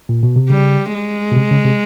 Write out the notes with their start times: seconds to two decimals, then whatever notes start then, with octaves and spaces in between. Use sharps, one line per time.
0.09 A#2
0.23 B2
0.36 C3
0.49 C#3 G3
0.94 G#3
1.31 B2
1.36 C3
1.51 C#3
1.65 C3